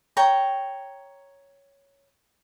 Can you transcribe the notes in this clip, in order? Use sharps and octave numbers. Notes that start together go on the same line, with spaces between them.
C#5 G5 A#5